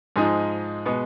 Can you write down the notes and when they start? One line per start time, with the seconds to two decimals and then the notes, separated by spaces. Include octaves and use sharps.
0.16 G#2 F3 G#3 D#4 G#4
0.86 B2 G#3 B3